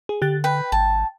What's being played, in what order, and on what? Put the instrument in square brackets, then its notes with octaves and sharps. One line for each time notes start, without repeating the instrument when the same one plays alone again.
[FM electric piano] G#4
[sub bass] D3 [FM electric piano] G4 F#6 A6
[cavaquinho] B4 [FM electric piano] G5
[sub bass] G#1 [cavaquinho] A5